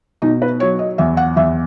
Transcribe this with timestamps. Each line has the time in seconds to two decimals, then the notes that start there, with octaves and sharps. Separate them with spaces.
0.22 B2 D#4
0.42 B4
0.60 F#3 C#5
0.79 D#5
0.98 E2 E5
1.17 F#5
1.36 E2 E5